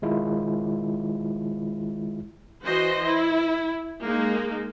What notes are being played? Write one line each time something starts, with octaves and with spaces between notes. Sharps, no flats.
D#3 G#3 E4 F4
E3 F#4 C5 D#5 C6
E4
G#3 A#3 D#4